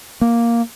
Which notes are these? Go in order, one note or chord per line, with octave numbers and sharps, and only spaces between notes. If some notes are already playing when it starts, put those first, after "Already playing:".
A#3